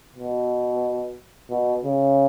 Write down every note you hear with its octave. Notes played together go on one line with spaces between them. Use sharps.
B2
B2
C#3